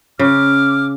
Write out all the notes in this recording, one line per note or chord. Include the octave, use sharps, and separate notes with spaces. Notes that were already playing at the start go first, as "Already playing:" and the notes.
C#3 D6 F6